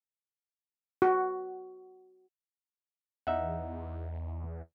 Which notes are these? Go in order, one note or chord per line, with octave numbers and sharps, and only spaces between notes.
F#4
E2 D#4 E5 F#5